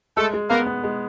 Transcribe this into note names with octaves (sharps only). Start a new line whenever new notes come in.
G#3 A3 A4
G#3
A#3 B3 A#4
B3
G#3